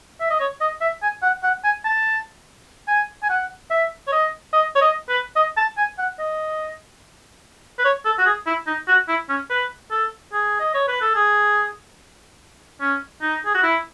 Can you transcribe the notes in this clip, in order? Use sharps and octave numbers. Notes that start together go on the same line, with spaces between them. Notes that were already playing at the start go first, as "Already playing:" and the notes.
E5
D#5
C#5
D#5
E5
G#5
F#5
F#5
G#5
A5
G#5
G#5
F#5
E5
C#5
D#5
D#5
C#5
D#5
B4
D#5
A5
G#5
F#5
D#5
B4
C#5
A4
F#4
G#4
E4
D#4
F#4
E4
C#4
B4
A4
G#4
D#5
C#5
B4
A4
G#4
C#4
D#4
G#4
F#4
E4